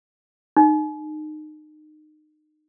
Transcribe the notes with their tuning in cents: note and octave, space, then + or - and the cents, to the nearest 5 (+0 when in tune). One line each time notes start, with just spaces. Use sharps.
D#4 -25